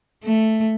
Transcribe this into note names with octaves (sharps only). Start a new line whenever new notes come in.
A3